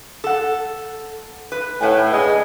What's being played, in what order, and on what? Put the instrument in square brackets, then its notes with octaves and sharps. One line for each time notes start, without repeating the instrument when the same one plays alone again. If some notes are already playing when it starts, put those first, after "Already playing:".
[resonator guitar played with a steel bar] A4 F#5
B4
[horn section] A2 [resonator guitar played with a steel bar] B4 F#5 G#5
[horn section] G2 C#3 G#3